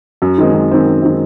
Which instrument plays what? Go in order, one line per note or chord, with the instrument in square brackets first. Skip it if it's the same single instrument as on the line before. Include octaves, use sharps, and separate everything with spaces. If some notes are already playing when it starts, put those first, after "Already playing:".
[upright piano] F#2
D#3 G#3 C4
F#2
D#3 G#3 C4
F#2
D#3 G#3 C4